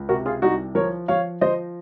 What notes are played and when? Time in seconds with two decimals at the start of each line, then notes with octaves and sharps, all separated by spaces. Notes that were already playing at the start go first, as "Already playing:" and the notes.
Already playing: C#2
0.09 C3 F#4 A#4
0.26 F4 G#4
0.42 C2 D#4 F#4
0.75 F3 A#4 C#5
1.08 F3 C#5 F5
1.41 F3 C5 D#5